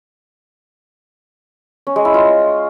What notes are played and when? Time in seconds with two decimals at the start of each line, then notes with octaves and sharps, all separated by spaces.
1.87 C#4
1.96 G#3
2.05 E4
2.14 F4